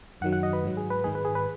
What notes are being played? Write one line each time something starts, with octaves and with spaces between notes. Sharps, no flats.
F#2 D#3 F#3 F#5
F#5
D#5
B4
G#2 F#3
G#4
B4
G#2 D#3 G#3 G#4
B4
G#4
B4